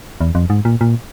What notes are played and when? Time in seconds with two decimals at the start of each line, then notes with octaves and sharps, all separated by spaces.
0.21 E2
0.35 F2
0.50 G#2
0.65 A#2
0.81 A#2